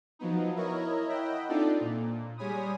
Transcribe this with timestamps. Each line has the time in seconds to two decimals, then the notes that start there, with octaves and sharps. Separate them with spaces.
0.19 F3 F#3 B3 D#4
0.56 E4 A#4 C#5 D#5
1.09 D#5 E5 F#5 G5 B5
1.49 C4 D4 D#4 F4 A4 D5
1.80 A#2
2.38 G3 G#3 C#5 G#5 B5 D#6